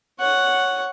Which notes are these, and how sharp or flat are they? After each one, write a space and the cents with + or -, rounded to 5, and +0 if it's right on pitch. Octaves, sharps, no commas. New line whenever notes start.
C#5 +0 F#5 +0